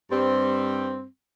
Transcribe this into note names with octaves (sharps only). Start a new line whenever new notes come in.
G2 G3 C4